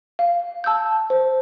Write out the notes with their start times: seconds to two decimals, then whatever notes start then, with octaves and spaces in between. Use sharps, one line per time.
0.19 F5
0.64 A5 E6 G6
1.10 C5